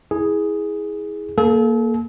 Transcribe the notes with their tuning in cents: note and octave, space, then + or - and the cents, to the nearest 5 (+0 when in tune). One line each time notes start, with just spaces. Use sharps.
E4 -25 G#4 +0
A#3 +0 A4 -40